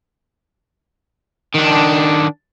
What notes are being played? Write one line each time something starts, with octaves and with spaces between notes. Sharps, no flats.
D#3 D4